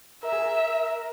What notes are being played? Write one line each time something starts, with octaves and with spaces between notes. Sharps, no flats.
A#4 E5
G#4
A#4